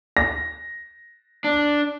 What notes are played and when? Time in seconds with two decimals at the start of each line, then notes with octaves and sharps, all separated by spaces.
0.17 A#6
1.44 D4